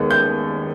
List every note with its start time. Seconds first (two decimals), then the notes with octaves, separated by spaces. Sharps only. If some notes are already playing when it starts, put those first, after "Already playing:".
Already playing: D#2 G#3 B3
0.11 G6